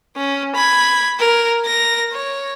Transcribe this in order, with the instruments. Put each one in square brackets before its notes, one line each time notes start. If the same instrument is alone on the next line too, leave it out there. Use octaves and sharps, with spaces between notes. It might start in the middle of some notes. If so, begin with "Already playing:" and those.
[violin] C#4
B5 G#6
A#4
A#4 A#6
C#5